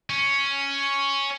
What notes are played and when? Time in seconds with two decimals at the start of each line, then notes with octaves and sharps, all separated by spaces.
0.10 C#4